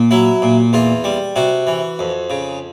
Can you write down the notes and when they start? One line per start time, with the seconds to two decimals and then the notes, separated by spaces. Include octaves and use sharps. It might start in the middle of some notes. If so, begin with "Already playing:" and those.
Already playing: A#2
0.11 F#3 E4
0.42 A#2
0.73 E2 F4
1.04 G3
1.36 C3 F#4
1.67 E3
1.99 F2
2.30 C#3